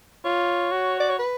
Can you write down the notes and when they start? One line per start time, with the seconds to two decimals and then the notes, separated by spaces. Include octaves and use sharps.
0.25 F4 C#5
0.72 F#4
1.00 D5
1.09 C#5
1.19 B4